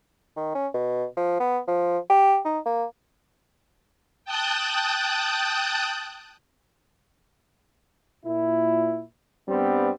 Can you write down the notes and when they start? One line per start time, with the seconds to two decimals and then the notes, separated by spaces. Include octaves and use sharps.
0.37 D#3
0.55 C#4
0.74 B2
1.17 F3
1.40 B3
1.67 F3
2.10 G4
2.45 D#4
2.66 A#3
4.25 G5 A5 D#6 F#6 G6 A6
8.26 A#2 E4
9.49 G2 G3 B3 C4